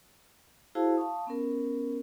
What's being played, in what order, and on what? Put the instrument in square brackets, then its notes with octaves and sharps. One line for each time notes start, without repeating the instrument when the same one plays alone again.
[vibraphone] E4 F#4 G#4 C5 F5 A5
F5 A5 C#6 D#6
B3 C#4 A#4